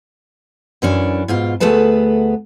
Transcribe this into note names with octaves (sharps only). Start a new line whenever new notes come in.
F#2 E3 C#4 D4
G#2 B2 F4
D2 A3 B3 G#4 B4 A5